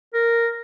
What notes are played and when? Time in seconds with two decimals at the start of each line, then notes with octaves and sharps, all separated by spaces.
0.14 A#4